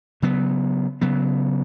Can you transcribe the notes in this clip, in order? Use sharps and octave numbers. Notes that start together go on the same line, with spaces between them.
C#3 F#3 B3
C#3 F#3 B3